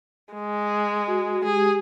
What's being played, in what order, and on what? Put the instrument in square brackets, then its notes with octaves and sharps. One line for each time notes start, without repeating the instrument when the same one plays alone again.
[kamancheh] G#3
[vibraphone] F#4
[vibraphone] G#3 G4 [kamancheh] G#4